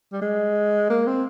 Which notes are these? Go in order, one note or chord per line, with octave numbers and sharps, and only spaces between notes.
G3
G#3
A#3
C4